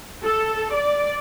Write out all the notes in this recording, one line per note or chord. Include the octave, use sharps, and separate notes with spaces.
A4
D5